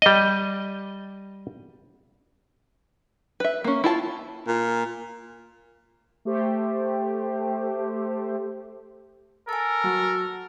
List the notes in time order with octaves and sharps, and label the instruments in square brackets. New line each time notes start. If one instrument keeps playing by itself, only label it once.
[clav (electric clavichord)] G3 D#5
[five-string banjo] B4 E5
A#3 C#4
E4 F4 A5
[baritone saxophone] A#2
[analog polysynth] A3 G4 C5
[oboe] A4 [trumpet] A#4 [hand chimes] G#5 A5
[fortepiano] F#3 F#4